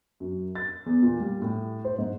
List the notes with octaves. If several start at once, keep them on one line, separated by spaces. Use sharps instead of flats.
F#2
A6
E2
A#2
G3
A2
C5
G#2